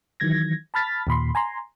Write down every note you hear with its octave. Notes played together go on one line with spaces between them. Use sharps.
D#3 E3 F#3 G#6 A#6
A5 B5 F6 A6 B6
D#2 A#2 B5 C6
G#5 A#5 C6